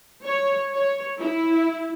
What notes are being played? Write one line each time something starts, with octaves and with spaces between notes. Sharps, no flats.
C#5
C#5
E4